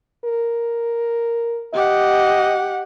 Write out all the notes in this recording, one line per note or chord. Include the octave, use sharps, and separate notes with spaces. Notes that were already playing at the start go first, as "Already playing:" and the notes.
A#4
G4 D#5 F#5